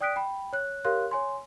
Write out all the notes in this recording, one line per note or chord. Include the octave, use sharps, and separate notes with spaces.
D5 G5 D#6 F#6 B6 D7
G5 B5
C#5 F#6
G4 A#4 C#5 F5 C6 F#6
C#5 G#5 C6